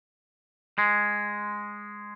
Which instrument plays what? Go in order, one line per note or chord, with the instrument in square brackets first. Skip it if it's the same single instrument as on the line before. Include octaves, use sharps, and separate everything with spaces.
[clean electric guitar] G#3